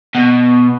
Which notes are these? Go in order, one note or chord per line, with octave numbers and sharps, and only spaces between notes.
B2